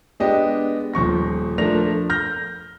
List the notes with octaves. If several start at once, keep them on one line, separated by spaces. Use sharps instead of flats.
G#3 B3 D4 G4 D#5
D#1 F3 C#6 A#6
F3 A3 D4 A#4 A#6 F7
F6 G6 A#6